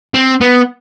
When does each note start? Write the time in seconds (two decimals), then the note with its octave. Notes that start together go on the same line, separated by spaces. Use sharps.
0.14 C4
0.41 B3